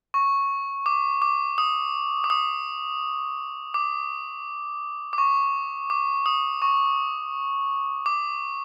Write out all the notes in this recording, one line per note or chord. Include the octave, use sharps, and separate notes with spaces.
C#6
D6
D6
D#6
D6
D#6
D6
D6
C#6
D6
D#6
C#6
D6